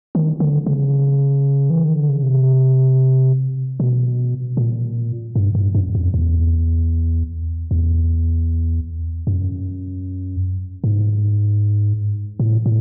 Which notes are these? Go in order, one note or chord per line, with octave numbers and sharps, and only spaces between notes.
D#3
D3
C#3
E3
D#3
D3
C#3
C3
B2
A#2
G2
G2
F#2
F2
E2
E2
F#2
G#2
A2
A2